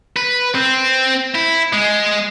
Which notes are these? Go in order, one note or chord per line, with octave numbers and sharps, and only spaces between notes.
B4
C4
E4
G#3